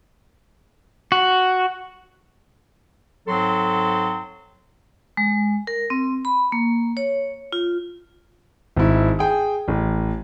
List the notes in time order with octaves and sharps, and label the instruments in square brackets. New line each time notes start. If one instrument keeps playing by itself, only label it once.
[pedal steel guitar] F#4
[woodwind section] G#2 F#3 C4 A4 C6
[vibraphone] G#3
A#4
C4
B5
A#3
C#5
F4
[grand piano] G#1 E4
G#4 G5
A1